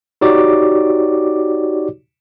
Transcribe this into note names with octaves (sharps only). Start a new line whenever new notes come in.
D#4 F#4 G4 C#5 D5 D6